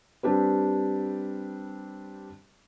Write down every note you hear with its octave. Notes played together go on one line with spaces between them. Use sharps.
G3 C4 D4 G4 B4